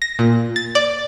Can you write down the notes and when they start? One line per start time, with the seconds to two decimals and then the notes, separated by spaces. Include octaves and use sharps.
0.02 A#6
0.19 A#2
0.56 A6
0.75 D5